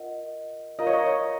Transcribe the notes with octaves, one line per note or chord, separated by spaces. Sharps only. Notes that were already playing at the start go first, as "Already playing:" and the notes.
Already playing: F4 A#4 D#5 F#5
F4 A#4 D#5 F5 A#5
C#5
D#5
C#5